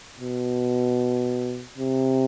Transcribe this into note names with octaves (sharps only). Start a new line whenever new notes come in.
B2
C3